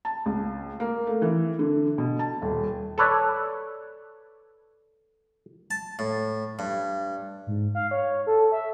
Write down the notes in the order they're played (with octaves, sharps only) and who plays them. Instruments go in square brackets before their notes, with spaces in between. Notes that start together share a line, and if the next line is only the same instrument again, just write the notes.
[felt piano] A5
C#2
A#3
A3
E3
D3
B2
A5
D#1
[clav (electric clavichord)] A4 B4 C#5 D5
[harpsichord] A5
A2
G2
[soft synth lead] G#2
F5
C#5
A4
E5